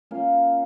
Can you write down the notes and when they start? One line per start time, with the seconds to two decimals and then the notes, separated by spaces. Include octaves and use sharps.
0.11 A#3 C#4 F4